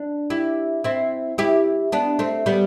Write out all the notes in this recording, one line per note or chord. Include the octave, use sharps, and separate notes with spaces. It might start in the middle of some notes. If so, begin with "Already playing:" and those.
Already playing: D4
E4 G4
C4 E4
E4 G4
B3 D4
A3 C4
G3 B3